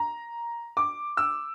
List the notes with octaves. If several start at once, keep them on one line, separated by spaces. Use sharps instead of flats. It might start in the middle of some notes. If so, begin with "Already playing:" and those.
Already playing: A#5
D6
E6